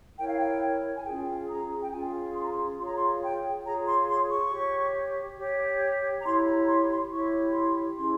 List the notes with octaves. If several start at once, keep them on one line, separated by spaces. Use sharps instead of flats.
E4 A#4 C#5 G5
F5
G5
G#5
C#4 F4 G#4 G5
A#5
G5
C#4 F4 G#4 G#5
C6
A#5
C6
F4 G#4 C#5 C6
A#5
C6
G5
F4 G#4 C#5 A#5
C6
C6
C#6
G4 C#5
G4 C#5
A#5
E4 G4 C#5 C6
A#5
C6
C6
E4 G4 C#5 C#6
C6
C#4 E4 G#4 C6